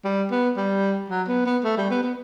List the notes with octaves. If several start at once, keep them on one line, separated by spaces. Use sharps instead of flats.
G3
B3
G3
F#3
B3
B3
A3
G3
B3
B3